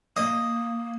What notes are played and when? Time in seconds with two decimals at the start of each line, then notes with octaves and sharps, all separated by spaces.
0.17 A#3 D#5